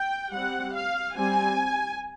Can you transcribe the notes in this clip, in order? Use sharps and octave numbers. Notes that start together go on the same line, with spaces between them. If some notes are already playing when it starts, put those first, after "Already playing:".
Already playing: G5
G3 C4 F#5
F5
G3 C4 G#5